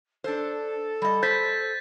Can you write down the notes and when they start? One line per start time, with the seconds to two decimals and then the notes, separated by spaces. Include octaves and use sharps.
0.24 D4 A4 C5
1.02 G3 D#5
1.23 C5 G6 A6 B6